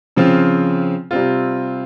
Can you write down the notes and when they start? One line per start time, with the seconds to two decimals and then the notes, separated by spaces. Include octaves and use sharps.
0.17 C#3 F3 C4 F4
1.11 C3 G3 C4 F4